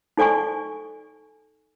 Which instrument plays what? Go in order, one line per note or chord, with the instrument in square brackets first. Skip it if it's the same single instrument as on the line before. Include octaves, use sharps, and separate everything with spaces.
[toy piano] D#4 A4 D5 G#5 C#6